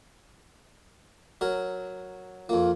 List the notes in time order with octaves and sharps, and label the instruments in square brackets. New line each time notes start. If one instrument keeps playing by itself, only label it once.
[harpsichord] F#3 A#4
[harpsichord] F2 A#3 [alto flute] F4